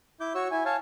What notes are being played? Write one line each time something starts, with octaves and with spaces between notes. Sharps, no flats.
E4 D6 G6
F#4 C#5 C#6 E6
E4 G#5
C#5 F5 G#5 A5